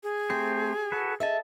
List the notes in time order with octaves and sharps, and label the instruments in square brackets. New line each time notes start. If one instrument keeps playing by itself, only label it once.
[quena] G#4
[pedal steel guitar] A3 C4 C5 [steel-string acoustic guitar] G4
[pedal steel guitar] F#4 A4 B4
[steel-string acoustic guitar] G#4 D#5 E5 [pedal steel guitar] A4 A5